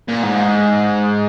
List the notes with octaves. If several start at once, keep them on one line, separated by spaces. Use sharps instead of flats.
A#2
G#2